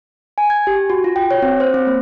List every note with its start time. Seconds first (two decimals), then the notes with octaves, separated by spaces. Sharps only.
0.38 G#5
0.50 G#6
0.67 G4
0.90 F#4
1.04 F4
1.16 G5
1.31 C#5
1.42 C4
1.60 C5
1.74 C4
1.87 A#3